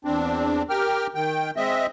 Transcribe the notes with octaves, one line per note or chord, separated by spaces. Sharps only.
E2 C4 D4
G4 A#4 G5 F6
D#3 G5
G#3 C4 D#5 E5